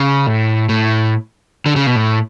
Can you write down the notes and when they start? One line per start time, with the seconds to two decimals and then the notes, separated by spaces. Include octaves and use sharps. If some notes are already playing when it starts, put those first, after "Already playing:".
Already playing: C#3
0.27 A2
0.69 A2
1.66 D3
1.76 C#3
1.86 B2
1.96 A2